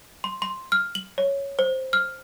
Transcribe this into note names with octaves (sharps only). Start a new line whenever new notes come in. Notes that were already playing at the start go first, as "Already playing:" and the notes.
C6
C6
F6
F#7
C#5
C5
F6